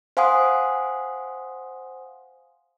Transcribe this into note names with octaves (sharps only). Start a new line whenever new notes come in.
C5 F5 F#5 G#5 C6 D#6